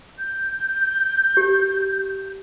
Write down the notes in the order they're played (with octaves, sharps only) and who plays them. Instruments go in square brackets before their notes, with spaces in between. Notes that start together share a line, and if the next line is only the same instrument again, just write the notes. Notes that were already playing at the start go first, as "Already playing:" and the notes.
[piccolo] G6
[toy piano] G4